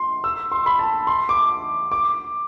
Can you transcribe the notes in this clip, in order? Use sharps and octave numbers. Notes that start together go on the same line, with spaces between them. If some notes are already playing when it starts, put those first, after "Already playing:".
Already playing: C6
E6
C6
B5
A5
C6
D6
D6